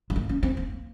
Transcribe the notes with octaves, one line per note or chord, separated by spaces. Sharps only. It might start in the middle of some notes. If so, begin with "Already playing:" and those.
G#3
A#3
C#4
C4
A#3